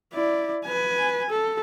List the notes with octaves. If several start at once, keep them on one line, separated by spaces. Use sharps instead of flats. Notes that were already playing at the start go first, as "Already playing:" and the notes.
E4 D5
B4 G#5
A4